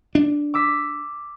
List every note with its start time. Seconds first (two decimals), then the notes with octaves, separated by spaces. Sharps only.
0.15 D4
0.54 D6 E6 B6